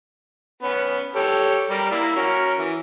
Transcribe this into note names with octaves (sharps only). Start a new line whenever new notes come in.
B3 C#4
G4 A4 C#5
G3 A#4
A#3 E4
C#4 F#4 A#4
E3